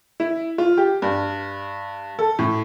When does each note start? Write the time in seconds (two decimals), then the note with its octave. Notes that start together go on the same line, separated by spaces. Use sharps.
0.20 E4
0.58 F4
0.77 G4
1.02 G2
2.19 A4
2.39 A2